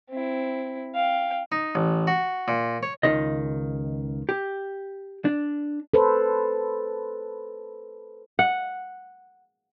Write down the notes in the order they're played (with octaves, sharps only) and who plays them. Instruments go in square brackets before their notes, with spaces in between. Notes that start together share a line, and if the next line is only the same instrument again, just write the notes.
[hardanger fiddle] C4 E4
F5 G5
[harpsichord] D#4
A1
F#4
A#2
C#5
[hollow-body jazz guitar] C#2 D#3 D#5
G4
D4
[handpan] A4 B4 C5
[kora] F#5